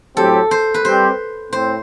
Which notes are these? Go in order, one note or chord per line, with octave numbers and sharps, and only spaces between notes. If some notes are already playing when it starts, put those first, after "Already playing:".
A2 F#3 C4 G4 A4
C5
B4
G3 C4 G4 C5
A2 C4 C5